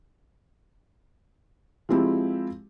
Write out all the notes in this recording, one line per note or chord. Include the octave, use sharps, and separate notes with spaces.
F3 G#3 C4 E4 G4